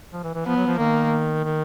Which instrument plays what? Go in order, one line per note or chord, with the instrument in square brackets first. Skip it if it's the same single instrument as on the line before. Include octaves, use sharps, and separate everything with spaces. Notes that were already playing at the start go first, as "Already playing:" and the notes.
[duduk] F3
E3
E3
[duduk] F3 [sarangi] B3
[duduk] F#3
F3
[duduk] D#3 [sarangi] A#3
[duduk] D#3